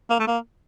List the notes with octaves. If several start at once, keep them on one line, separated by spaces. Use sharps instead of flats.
A#3
A3
A#3